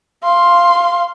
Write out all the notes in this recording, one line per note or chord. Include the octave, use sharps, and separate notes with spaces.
F5 C6